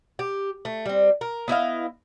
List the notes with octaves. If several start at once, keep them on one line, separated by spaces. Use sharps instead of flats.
G4
A3
G3 C4
A#4
B3 E4 D#5 F5